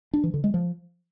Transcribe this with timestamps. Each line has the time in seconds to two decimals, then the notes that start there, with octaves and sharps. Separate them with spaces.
0.14 D4
0.24 E3
0.34 D3
0.44 G#3
0.54 F3